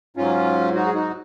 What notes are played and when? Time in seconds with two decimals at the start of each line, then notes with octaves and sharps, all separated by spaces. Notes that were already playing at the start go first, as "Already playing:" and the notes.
0.17 G#2 F#3 C#4 F4
0.75 D#4 F#4
0.86 G#4
0.94 D#4 F#4